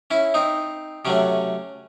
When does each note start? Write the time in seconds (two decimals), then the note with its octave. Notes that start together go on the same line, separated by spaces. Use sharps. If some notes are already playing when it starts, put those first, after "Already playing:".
0.11 C#4 E4
0.34 C4 D#4
1.05 C3 F#3 A3 C#4